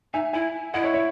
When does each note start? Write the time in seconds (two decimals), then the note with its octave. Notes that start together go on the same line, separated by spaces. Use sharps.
0.14 D#4 E5 G#5
0.33 E4 E5 G#5
0.74 E4 D#5 F#5
0.84 C#5 E5
0.94 C#5 E5